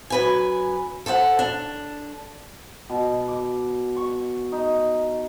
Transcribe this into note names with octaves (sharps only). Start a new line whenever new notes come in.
F#2 B4 G#5
A4 C5 D#5 F#5
D4
B2
D6
C#6
D#4